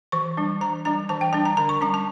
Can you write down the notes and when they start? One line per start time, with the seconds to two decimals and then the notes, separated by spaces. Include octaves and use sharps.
0.12 E3 C#6
0.37 G3 D4
0.61 E3 A#5
0.85 G3 D4 A#5
1.09 E3 A5
1.21 G5
1.33 G3 D4 A5
1.45 A#5
1.57 D3 A#5
1.69 C#6
1.81 G3 C#4 A#5
1.94 A5